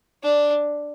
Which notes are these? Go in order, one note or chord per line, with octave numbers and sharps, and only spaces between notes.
D4